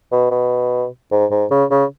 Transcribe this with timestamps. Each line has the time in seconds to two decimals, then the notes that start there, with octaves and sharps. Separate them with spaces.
0.12 B2
0.31 B2
1.12 G#2
1.31 G#2
1.51 C#3
1.71 C#3